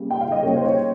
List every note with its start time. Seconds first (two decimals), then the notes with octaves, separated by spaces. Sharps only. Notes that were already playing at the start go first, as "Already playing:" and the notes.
Already playing: C#3 G3 A#3
0.11 G5
0.21 F5
0.32 D#5
0.43 C#3 G3 A#3 C#5
0.56 C5
0.65 C#5